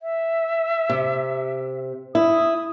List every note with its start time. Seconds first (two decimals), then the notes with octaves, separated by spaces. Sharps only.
0.02 E5
0.89 C3
2.15 E4 D#6